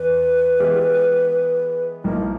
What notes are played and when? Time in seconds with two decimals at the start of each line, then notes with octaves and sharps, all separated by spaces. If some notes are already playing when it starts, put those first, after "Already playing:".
Already playing: E2 B4
0.60 E3 G#3 B3 E4 G4
2.04 B1 A2 F3 A#3 D#4 A#4